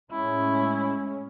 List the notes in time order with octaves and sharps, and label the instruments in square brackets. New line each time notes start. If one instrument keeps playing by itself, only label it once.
[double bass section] A2 G#3 C#4 [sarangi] E4